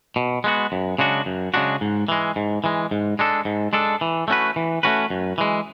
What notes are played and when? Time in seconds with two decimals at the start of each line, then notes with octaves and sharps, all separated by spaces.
0.16 B2
0.44 G#3 B3 F#4
0.72 F#2
0.98 C#3 G#3 D4 F#4
1.26 F#2
1.54 C#3 G#3 D4 F#4
1.81 G#2
2.08 E3 G#3
2.36 G#2
2.64 E3 G#3
2.91 G#2
3.19 G#3 D4 A4
3.45 G#2
3.73 G#3 D4 A4
4.01 E3
4.28 A3 C#4 F#4 B4
4.56 E3
4.83 A3 C#4 F#4 B4
5.10 F#2
5.38 E3 G#3